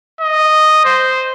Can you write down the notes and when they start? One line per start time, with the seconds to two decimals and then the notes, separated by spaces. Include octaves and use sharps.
0.21 D#5
0.85 C5